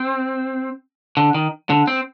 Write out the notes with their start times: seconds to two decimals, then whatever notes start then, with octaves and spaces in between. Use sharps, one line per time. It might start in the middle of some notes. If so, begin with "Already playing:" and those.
Already playing: C4
1.17 D3
1.34 D#3
1.70 D3
1.87 C4